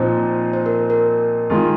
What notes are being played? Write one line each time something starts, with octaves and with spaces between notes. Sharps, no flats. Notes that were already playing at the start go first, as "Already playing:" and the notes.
Already playing: A#2 F3 C4 D#4 C5
C5
A#4
A#4
D#3 G#3 F4